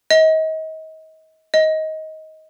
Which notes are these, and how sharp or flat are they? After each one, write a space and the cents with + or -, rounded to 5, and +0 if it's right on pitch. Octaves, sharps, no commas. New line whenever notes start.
D#5 +35
D#5 +20